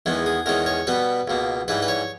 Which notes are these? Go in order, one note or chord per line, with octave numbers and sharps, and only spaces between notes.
E2 D#3 G#3 B3
G#4
E2 D#3 G#3 C#4 A#4
C#5
B2 G3 B3 B4
C#2 B2 A#3
G#2 E3 G3 B4
B4
C#5